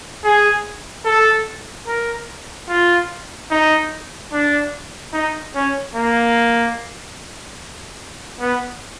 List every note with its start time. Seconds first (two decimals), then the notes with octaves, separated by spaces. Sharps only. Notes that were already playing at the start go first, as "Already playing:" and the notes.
0.24 G#4
1.05 A4
1.87 A#4
2.69 F4
3.51 D#4
4.32 D4
5.13 D#4
5.55 C#4
5.95 A#3
8.40 B3